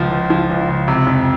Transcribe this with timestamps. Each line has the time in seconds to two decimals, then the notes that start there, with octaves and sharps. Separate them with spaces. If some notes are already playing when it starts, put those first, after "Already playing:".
Already playing: C#2 F3
0.11 C#2
0.30 F3
0.50 C#2
0.69 C#2
0.88 C3
1.07 F2